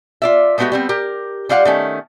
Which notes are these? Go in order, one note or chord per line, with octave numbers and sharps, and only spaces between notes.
F4 D5 E5
G#3 A3 B3 C#4 F#4 G4
G3 B3 C4
G4 A#4
G3 F4 D5 F5 F#5
D#3 A3 C#4